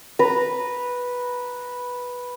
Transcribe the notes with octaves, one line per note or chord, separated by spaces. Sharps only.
B4 A#5